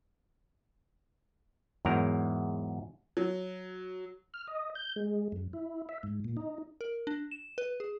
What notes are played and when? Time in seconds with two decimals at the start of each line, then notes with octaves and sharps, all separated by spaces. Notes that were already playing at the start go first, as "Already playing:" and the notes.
1.85 E2 G#2 F#3 A#4 A#5
3.17 F#3
4.34 F6
4.47 D#5
4.75 G6
4.96 G#3
5.32 F#2
5.53 E4
5.89 E5
6.03 G#2
6.24 A#2
6.37 D#4
6.81 A#4
7.07 D4
7.31 E7
7.58 B4
7.80 G#4